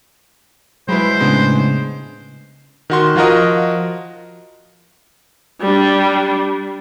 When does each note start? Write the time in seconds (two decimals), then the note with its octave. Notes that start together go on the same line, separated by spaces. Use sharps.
0.88 F#3 G#3 E4 B4 C5 B5
1.20 A2 C#3 G#3 B3 D4
2.90 D#3 F#4 C6
3.16 F3 F4 F#4 A#4 D#5
5.61 G3 D4